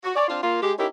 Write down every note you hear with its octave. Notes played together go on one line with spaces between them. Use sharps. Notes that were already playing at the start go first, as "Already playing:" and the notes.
F#4
C#5 D5
C4 D4 F4
A#3 F4
G#3 G4
C#4 D#4 E4 G4 A#4